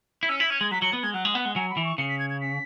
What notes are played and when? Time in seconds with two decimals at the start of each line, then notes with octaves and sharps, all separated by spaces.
0.23 E4
0.29 C#4 E6
0.39 E4 B6
0.50 C#4 G#6
0.61 G#3 G#6
0.71 F#3 B6
0.82 F#3 C#7
0.93 B3
1.03 G#3 G#6
1.13 F#3 F#5
1.25 G#3
1.34 B3 F#5
1.45 G#3
1.56 F#3 G#5
1.70 B5
1.77 E3
1.85 C#6
1.98 C#3 C#7
2.09 B6
2.19 G#6
2.30 G#6
2.41 B6